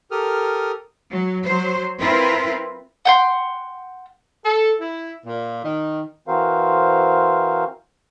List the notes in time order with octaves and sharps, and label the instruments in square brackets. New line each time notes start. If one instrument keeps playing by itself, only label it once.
[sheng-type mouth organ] G4 A4 A#4 D#6 F6
[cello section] F#3
F#3 C5
C4 E4 F4 A#4 B4
[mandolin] F#5 G5 C6
[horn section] A4
E4
A#2
D#3
[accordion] E3 C4 F#4 A#4 C5 F5